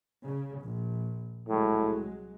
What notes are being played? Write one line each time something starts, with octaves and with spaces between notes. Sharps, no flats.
C#3
A#1
C2 A2 F#3 G#3